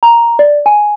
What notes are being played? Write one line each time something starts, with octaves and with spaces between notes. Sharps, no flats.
A#5
D5
G#5